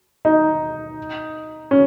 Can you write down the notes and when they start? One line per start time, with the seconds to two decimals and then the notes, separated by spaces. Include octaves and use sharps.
0.25 D#4
1.71 C#4